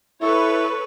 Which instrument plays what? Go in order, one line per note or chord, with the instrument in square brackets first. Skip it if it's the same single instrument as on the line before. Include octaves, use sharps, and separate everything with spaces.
[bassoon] E4 [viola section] A4 B4 [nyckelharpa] C#5 C#6